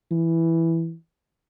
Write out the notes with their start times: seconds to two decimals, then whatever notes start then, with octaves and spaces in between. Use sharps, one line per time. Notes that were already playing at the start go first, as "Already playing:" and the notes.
0.11 E3